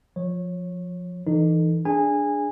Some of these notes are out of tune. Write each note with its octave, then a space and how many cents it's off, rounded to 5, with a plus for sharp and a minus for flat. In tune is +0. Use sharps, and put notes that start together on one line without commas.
F3 +15 C#5 -15
E3 +0 D#4 -20 A4 +20
D4 +0 G#4 +0 G#5 -20